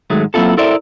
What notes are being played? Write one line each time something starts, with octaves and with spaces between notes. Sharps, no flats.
G#2 D#3 F#3 G#3 A3
F#3 A#3 C4 E4 F4 A4
E4 A4 A#4 C5 D5 E5